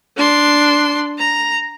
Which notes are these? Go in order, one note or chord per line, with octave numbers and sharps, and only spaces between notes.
D4 C6
A#5